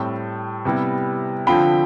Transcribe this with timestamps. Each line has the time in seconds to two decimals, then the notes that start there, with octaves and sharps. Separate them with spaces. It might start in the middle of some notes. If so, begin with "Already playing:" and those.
Already playing: A2 G3 C4 A5
0.65 C3 G3 B3 E4
1.47 D3 F3 C4 F4 G5 B5